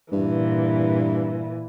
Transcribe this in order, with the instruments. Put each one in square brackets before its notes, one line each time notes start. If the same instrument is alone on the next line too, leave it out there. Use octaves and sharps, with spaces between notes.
[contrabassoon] G2 [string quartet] A#2 E3